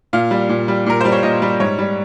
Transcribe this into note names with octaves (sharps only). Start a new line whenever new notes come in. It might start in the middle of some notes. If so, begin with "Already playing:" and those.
A#2 F5
G3
A#2
G3
A#2 A#4
G3 C5
C#5
A#2 D#5
G3
G#2 C#5
G3